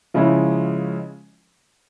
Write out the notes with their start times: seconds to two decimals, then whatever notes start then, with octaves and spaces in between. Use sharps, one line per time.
0.14 C#3 F3 G#3 C#4 E4